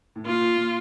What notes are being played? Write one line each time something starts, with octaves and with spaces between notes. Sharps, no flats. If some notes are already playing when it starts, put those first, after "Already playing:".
A2
A#2 F4
A#2
A#2